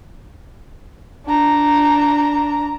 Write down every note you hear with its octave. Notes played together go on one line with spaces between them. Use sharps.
D4 A#5